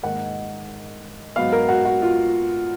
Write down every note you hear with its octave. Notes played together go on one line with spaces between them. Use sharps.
G#2 D#3 A#3 F#5
G#2 F#3 B3 F5
A#4
F#4
F#4
F4